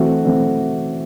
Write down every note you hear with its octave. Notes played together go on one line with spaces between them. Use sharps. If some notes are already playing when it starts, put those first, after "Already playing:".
Already playing: E3 A3 C4 F#4 F#5
E3 A3 C4